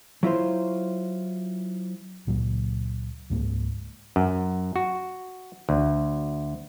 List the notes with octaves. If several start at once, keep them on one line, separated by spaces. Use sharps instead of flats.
F#3 E4 F4 C5
C#2 A#2 F#3
C#2 G#2 A#3
F#2
F#4
D2